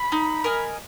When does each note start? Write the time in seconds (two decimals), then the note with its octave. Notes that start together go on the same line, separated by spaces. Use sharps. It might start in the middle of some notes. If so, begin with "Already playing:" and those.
Already playing: B5
0.12 D#4
0.44 A#4 D#5 G#5